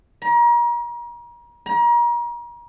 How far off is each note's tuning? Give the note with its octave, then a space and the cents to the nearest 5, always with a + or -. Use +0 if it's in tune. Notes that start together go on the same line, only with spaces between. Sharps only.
A#5 +35
A#5 +35